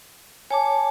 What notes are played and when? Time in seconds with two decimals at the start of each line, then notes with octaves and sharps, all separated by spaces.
0.51 C#5 G#5 A5 D6